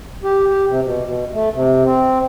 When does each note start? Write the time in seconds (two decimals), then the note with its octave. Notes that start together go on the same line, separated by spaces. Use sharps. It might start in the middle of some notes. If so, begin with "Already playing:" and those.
0.24 G4
0.48 G4
0.68 C3
0.84 B2
1.05 B2
1.33 A3
1.54 C3
1.84 C4